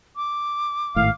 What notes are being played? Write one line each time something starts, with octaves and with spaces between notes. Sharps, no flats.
D6
G#1 A2 F5